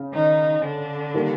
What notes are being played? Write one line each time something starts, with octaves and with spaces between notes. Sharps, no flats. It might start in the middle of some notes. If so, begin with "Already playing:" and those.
Already playing: C#3
D#3 D#4
D3 D4
D#3 G3 A#3